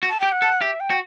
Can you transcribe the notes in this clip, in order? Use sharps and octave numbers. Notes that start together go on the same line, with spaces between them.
F#4
A5
G4 G5
F#5
A4
G4 E5
G5
F#4